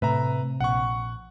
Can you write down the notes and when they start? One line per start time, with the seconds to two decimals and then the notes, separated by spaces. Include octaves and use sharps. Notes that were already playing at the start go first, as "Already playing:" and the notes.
0.02 A2 C3 B4 E5 A#5
0.60 A#1 F#5 C#6